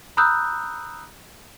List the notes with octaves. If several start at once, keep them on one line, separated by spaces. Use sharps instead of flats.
A#5 B5 D#6 E6 F#6 G6